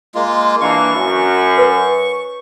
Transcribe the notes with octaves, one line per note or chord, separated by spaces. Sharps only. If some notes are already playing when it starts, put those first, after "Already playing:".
G#3 A#3 F4
E3 A#3 D4 C#6
F#2
B4